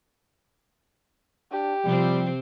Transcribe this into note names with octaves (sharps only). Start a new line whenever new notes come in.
D4 G4
C3 F3 G3 C4